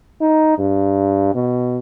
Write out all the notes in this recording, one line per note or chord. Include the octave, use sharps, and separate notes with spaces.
D#4
G2
B2